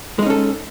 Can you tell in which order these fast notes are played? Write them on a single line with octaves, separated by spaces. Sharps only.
G#3 D#4 C#4 A4